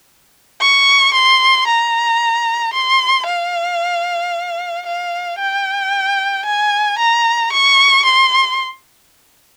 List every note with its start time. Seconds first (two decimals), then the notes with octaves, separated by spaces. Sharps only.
0.61 C#6
1.14 C6
1.67 A#5
2.73 C6
3.26 F5
4.86 F5
5.39 G5
6.45 G#5
6.98 A#5
7.52 C#6
8.05 C6